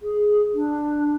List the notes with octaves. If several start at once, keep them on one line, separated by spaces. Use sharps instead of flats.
G#4
D4